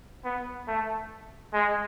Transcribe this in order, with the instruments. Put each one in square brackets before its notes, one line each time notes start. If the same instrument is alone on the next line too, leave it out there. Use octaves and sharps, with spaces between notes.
[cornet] B3
A3
G#3